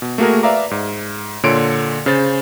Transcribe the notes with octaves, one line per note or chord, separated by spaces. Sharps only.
B2
A3 A#3 F#4 G#4 A#4
B4 D5 E5 F5 A#5 D6
G#2
A#2 D3 C#5 C6 C#7 D7
C#3 C5 A6